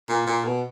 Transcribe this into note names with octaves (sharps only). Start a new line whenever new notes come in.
A#2
A#2
B2